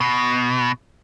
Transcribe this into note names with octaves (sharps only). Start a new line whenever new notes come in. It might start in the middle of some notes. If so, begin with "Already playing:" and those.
B2